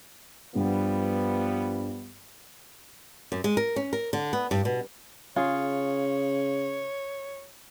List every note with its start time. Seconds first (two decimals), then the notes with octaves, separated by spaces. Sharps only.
0.55 G2 F3 G3 B3
3.32 F#2
3.44 G#3
3.57 A#4
3.76 C#4
3.93 A#4
4.13 D3
4.33 B3
4.51 G2
4.65 B2
5.36 C#3 F4 G#4 C#5